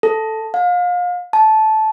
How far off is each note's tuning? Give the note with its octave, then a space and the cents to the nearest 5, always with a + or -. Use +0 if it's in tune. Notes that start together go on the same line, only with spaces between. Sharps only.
A4 +0
F5 +35
A5 -15